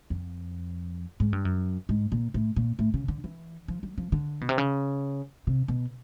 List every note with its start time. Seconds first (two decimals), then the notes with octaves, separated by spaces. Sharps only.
0.10 F2
1.20 G#2
1.33 G2
1.45 F#2
1.89 G#2
2.12 A#2
2.34 A2
2.56 A#2
2.79 A2
2.94 C#3
3.08 D3
3.24 E3
3.68 F3
3.83 F#3
3.98 F3
4.12 D3
4.41 B2
4.49 C3
4.58 C#3
5.47 C3
5.68 B2